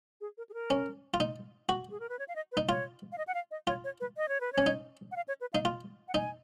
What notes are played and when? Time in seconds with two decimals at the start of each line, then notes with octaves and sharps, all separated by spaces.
0.21 G#4
0.38 A#4
0.49 G#4
0.54 A#4
0.70 C#4
1.14 F4
1.20 D#4
1.69 F#4
1.91 G#4
2.00 A#4
2.09 B4
2.19 C#5
2.28 F5
2.36 D#5
2.52 B4
2.57 D#4
2.69 F4 C#5
3.12 F5
3.18 D#5
3.27 F#5
3.34 F5
3.51 D#5
3.67 F4 C#5
3.84 C#5
4.00 B4
4.17 D#5
4.29 C#5
4.41 B4
4.53 C#5
4.58 C#4
4.66 D#4
5.11 F#5
5.16 F5
5.28 C#5
5.41 B4
5.53 D#4 F5
5.65 F4
6.08 F#5
6.14 D#4 G#5